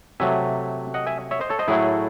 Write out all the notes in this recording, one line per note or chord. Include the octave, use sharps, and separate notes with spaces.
C3 F#3 A3 E5 G#5
D#5 F#5
E5 G#5
C#5 E5
C5 D#5
A4 C#5
C5 D#5
A2 F#3 A3 E4 G#4